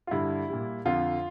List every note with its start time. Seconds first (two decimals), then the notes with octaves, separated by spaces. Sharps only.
0.07 F4
0.11 G2 D3 G3 E4
0.49 A#2 G3
0.85 F2 D3 F3 F4